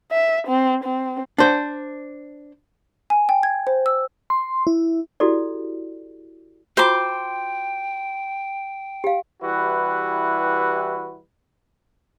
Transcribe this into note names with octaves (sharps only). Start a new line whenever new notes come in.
E5
C4
C4
D4 C5
G#5
G5
G#6
C5
E6
C6
E4
E4 F#4 G4 A4 D5
F4 F#4 C5 G5 A#5 D6
G4 F5
E3 G3 E4 F#4 G4 B4